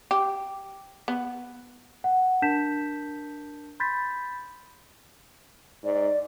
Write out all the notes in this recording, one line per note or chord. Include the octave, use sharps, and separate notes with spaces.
G4
B3
F#5
D4 A#4 A5 G6 B6 E7
B5 C6 G6 A6 B6
G#2 D5